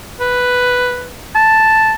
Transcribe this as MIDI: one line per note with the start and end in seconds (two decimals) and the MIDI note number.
0.21 1.09 71
1.35 1.93 81